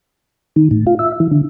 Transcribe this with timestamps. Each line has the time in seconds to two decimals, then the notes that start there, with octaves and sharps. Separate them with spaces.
0.56 D#3
0.71 A2
0.87 F4
0.99 E5
1.20 E3
1.31 D3